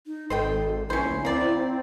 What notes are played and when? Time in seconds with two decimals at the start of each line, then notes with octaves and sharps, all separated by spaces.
0.07 D#4
0.30 G#1 A4 C5 D#5 G5
0.90 A#1 C#4 E4 C5
1.10 D2
1.25 A#3 C4 D5